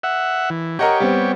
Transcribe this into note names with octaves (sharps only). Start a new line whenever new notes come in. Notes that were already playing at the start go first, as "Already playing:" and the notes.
E5 F#5
E3
G4 A#4 C#5 D#5 F#5
G3 B3 C4